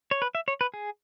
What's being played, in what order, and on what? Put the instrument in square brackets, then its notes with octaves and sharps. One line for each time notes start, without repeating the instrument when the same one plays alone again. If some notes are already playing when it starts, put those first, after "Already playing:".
[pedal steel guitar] C#5
B4
E5
C#5
B4
G#4